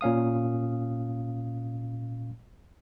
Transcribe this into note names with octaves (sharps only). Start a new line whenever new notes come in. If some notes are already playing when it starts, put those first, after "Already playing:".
A#2 C#4 F5 D#6